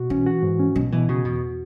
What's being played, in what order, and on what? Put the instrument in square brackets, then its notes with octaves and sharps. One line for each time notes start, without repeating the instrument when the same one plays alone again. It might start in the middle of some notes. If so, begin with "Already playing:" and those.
Already playing: [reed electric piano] B2 F#4
[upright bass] E3 [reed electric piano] C#4
[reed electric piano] F#4
G#2
C#4
[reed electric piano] B2 [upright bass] F#3
[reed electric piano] B2 [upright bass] E3
[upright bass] C#3 [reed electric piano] F#4
[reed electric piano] E2 [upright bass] B2